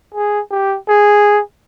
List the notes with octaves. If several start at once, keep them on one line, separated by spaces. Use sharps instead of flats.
G#4
G4
G#4